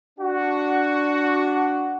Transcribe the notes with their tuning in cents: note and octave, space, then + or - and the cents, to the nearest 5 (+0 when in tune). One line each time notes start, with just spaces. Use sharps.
D4 -5 F#4 +5